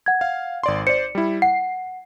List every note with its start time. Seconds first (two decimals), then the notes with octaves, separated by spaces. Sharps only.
0.06 F#5 G#6
0.21 F5
0.63 G#1 D5 C6
0.87 C5 D5 C#7
1.15 G3 E4
1.42 F#5 C7